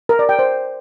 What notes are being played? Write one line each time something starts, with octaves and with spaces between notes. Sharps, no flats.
A#4
D5
G5
C5